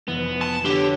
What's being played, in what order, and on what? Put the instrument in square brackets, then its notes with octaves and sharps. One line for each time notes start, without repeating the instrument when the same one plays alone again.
[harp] F1 E3 [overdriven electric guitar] B3
[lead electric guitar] A5
[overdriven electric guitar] D3 [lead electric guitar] G4 [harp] B4 C#5